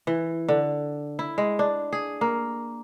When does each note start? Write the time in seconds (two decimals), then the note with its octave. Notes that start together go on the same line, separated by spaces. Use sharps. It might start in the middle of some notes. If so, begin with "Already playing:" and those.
0.07 E3
0.48 D3
1.19 E4
1.38 G#3
1.59 D4
1.93 G#4
2.21 A#3